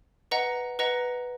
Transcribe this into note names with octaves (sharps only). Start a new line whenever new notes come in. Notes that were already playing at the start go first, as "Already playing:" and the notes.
B4 D#5 F#5 A#5
B4 D#5 F#5 A#5